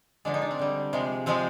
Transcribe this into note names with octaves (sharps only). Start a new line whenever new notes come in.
D3 F3 G#3 D4
D#4
D4
C4
D3 G3
C3 F3 G#3
C3 F3 G#3 C4